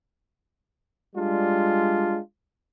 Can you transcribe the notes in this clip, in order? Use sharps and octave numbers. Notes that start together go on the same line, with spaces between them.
G3 G#3 D4 F4